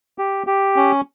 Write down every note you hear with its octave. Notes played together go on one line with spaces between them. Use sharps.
G4
G4
C#4